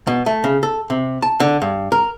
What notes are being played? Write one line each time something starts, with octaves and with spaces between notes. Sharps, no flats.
B2
A3
C#3
A4
C3
A5
D3
G2
A#4